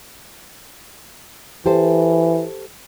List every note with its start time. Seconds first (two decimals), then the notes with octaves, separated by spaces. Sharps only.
1.66 E3 G4 A4 C5